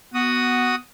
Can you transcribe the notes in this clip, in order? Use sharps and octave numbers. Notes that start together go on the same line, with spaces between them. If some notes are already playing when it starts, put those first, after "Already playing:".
B3 F#4 D#6